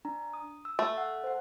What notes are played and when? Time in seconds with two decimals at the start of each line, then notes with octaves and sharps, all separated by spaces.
0.05 D4 A#5
0.34 D#6
0.65 E6
0.79 A3
0.98 F#5
1.24 C5 F#5